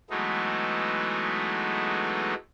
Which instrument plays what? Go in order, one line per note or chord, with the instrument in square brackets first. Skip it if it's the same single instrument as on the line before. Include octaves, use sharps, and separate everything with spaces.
[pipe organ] E3 F#3 G#3 A3 B3 D#4